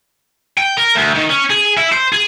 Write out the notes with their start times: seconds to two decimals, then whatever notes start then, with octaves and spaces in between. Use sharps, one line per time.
0.58 G5
0.78 A#4
0.96 D2
1.15 D#3
1.30 C#4
1.50 G#4
1.77 E4
1.92 C5
2.13 G#4